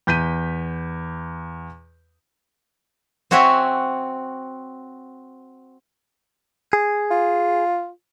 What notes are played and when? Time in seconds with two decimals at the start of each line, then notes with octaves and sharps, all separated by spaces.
0.07 E2 G6 B6 D#7
3.31 C4 F#4 C#5 E5 F#5 G#5
6.73 G#4
7.11 F4